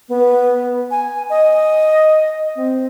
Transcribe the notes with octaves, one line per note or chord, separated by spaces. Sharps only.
B3
G#5
D#5
C4